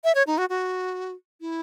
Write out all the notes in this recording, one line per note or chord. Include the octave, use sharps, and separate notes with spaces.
E5
C#5
D#4
F#4
F#4
E4